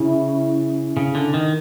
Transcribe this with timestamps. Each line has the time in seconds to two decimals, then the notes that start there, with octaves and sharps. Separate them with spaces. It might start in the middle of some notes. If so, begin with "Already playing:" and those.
Already playing: C#3 E4
0.97 C#3
1.15 D3
1.34 D#3